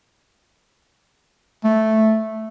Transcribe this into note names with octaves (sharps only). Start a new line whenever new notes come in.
A3